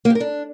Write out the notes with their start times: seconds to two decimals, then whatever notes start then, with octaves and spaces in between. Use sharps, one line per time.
0.05 A#3
0.10 G4
0.15 A#4
0.20 D4